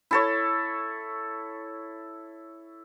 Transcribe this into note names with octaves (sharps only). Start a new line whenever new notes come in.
E4 A4 C#5